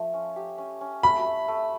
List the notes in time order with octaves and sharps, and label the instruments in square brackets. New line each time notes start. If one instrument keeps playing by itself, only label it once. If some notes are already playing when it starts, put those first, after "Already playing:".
Already playing: [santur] F3 A3
C#4
G4
C#4
C#4
[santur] A3 [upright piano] B5
[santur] A3
A3